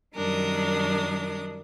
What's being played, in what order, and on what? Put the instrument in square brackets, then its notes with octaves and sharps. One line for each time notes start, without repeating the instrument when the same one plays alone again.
[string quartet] F#2 D#3 G3 D4 A#4 D#6